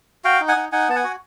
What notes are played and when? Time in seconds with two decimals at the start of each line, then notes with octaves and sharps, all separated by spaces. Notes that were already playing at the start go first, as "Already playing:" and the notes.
0.24 F#4 F5 G5
0.41 D#4
0.48 F#5 G#5
0.56 D#4
0.72 D#4 F#5 G#5
0.88 B3 A5
0.95 F#5 G#5
1.04 F#4